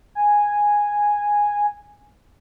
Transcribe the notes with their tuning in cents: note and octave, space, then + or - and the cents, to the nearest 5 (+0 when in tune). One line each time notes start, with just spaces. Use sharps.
G#5 -5